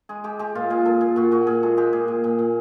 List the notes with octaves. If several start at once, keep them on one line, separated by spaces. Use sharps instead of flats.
G#3 G#4
G#3 G4
G#3 G4
A#2 F4
A#2 G#4
A#2 A4
A#2 G#4
A#2 F#4
A#2 F#4
A#2 G#4
G#3 A4
G#3 G4
A#2 G#4
A#2
A#2
A#2